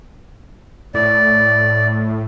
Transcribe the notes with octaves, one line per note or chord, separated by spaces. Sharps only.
A2 D5